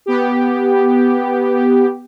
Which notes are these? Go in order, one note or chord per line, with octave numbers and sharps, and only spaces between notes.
B3 G4